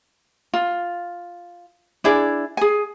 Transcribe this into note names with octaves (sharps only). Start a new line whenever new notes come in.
F4
D4 E4 G#4 D5
G#4 G#5